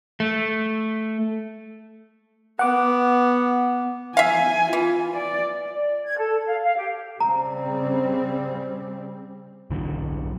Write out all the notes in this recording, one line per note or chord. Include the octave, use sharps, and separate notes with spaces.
A3
B3 F#5 D6
E5 F5 G#5
E3 F4
D5
D5
G#6
A4
F5
F5
G4
C#3 G3 C4 A#5
B1 D3 E3 F#3